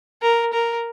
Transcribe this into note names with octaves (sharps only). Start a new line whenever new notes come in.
A#4
A#4